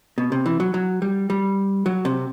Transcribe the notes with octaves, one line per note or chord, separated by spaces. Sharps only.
B2
C3
E3
F#3
F#3
G3
G3
F#3
C3